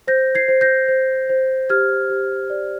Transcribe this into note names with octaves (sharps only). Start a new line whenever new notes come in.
C5 G6 A#6
G#6 C7
C5
G6 A#6
C5
C5
G4 F6 G#6
G4
D5